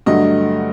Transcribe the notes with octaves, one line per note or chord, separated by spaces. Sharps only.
G2 D3 F#3 A3 D#5